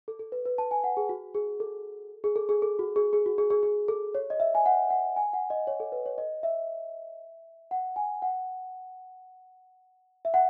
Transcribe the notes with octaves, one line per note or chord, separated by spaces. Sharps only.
A4
A4
B4
B4
A5
G#5
F#5
G#4
F#4
G#4
A4
G#4
A4
G#4
A4
F#4
G#4
G#4
F#4
G#4
G#4
G#4
A4
C#5
D#5
E5
G#5
F#5
F#5
G#5
F#5
D#5
C#5
A4
B4
C#5
D#5
E5
F#5
G#5
F#5
E5
F#5